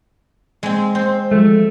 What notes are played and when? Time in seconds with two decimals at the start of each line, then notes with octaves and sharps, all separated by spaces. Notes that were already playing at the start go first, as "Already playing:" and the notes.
0.63 G#3 C4
0.95 C4 C5
1.31 F3 F#3 G#3 A3